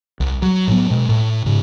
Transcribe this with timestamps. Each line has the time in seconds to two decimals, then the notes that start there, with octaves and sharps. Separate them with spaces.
0.20 C2
0.42 F#3
0.67 A2 F#3 B3
0.90 B2 G#3
1.09 A2
1.46 G#2 C#3